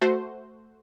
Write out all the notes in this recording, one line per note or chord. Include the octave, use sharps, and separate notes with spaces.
A3 F#4 C5